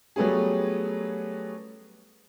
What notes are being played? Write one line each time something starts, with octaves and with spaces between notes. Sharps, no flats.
F#3 G3 A3 B3 C#4 G#4